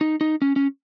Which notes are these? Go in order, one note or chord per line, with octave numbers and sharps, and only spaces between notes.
D#4
D#4
C#4
C#4